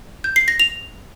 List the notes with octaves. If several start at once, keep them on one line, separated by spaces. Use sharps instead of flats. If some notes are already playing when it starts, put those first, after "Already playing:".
G6
C7
A#6
F7